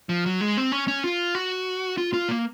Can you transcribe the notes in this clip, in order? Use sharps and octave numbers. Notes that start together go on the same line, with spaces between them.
F3
F#3
G#3
C4
C#4
C#4
F4
F#4
F4
F4
A#3